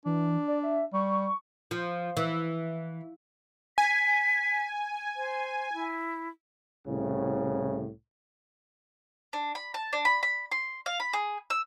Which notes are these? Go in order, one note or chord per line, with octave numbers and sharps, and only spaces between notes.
E3 D4
D5
E5
G3 C#6
F3
E3
G#5 B6
C5
E4
C2 A2 C#3
D4
B5
A5
D4
B5
B5
C6
F5
B5
G#4
E6